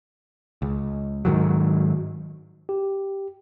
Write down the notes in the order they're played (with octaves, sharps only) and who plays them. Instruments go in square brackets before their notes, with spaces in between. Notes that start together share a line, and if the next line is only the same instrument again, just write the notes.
[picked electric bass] C#2
G#2 D#3 F#3
[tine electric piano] G4